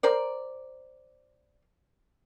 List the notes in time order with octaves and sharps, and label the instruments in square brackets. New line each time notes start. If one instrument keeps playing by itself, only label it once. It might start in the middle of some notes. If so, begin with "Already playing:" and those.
[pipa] A#4 C5 D5